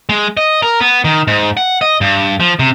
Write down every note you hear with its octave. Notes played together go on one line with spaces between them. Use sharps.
G#3
D#5
A#4
B3
D#3
G#2
F#5
D#5
G2
F3
C3